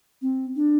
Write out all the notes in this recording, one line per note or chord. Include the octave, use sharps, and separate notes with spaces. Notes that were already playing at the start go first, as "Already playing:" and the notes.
C4
D4